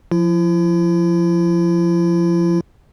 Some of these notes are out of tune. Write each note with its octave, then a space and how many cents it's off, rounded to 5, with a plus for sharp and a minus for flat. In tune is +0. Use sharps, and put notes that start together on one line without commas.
F3 +0 E4 +40